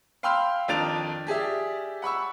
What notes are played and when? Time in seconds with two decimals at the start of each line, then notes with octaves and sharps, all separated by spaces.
0.23 F5 G5 B5 C6 E6 F6
0.68 F2 D#3 D4 A6 D7 F7
1.27 G4 G#4 D5 E5
2.02 F#5 B5 C#6 E6